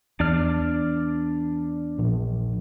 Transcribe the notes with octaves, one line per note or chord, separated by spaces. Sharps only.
E2 D4 D5 F6
A#1